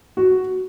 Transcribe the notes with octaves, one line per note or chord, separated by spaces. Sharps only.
F#4